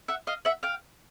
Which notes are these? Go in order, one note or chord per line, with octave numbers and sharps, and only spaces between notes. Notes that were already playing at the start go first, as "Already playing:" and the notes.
E5 F#5
D#5 F5
E5 F#5
F5 G5